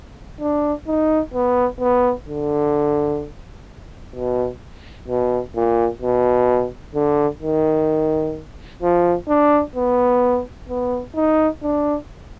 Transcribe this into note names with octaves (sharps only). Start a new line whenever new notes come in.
D4
D#4
B3
B3
D3
B2
B2
A#2
B2
D3
D#3
F3
D4
B3
B3
D#4
D4